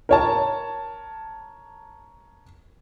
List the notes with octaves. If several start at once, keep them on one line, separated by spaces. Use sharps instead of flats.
A#4 C#5 A5